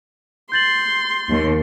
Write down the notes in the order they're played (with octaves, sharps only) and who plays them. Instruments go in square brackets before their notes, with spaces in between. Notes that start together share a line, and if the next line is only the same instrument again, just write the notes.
[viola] C6 [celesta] G6 A6 F#7
[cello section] D#2